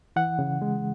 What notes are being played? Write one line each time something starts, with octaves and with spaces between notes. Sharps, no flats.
E3 F#5
C#3
G#3